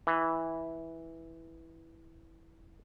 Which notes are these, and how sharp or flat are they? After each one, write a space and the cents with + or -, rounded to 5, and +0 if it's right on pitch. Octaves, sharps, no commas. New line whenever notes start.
E3 -10